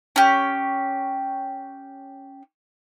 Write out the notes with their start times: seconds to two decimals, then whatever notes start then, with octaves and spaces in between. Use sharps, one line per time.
0.16 C#4 G4